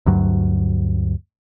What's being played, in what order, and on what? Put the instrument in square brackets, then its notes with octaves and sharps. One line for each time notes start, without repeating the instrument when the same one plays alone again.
[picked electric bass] D2 G2 F#3